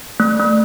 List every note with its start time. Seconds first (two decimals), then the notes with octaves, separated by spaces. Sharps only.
0.20 A3
0.39 A3